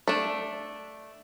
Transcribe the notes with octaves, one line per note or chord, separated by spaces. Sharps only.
A3 D4